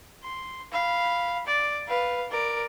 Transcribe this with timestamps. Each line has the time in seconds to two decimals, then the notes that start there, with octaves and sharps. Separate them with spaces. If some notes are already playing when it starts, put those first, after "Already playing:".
0.23 C6
0.72 F5 B5
1.46 D5
1.88 B4 F5
2.30 A#4 D5